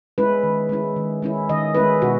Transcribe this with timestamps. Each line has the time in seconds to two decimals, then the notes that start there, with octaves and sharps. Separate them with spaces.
0.18 G#3 C#4 E4 B4
0.43 D#3
0.69 G#3 C#4 E4
0.96 D#3
1.22 G#3 C#4 E4
1.49 D#3 D#5
1.75 G#3 C#4 E4 B4
2.02 B2 F#4